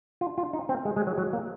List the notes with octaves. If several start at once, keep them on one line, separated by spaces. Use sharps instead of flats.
F4
F4
D#4
C4
G#3
G#3
F#3
F#3
A#3